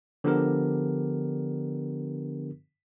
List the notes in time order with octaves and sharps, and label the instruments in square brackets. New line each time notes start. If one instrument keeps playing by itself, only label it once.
[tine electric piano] D3 F3 B3 D4 G4 A#4